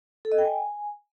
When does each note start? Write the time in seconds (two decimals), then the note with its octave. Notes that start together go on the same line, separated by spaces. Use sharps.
0.25 A4
0.32 D#5
0.38 G5
0.45 G#5